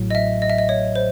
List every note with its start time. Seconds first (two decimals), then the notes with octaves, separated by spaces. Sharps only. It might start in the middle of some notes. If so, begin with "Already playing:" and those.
Already playing: A1 A2 F#3
0.10 D#5
0.15 E5
0.42 D#5
0.50 E5
0.58 D#5
0.69 C#5
0.95 C5